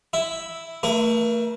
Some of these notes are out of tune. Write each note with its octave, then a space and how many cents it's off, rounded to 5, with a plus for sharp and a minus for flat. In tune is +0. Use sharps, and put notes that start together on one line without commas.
E4 +0 E5 -5
A3 +35 E4 -20 A#4 +40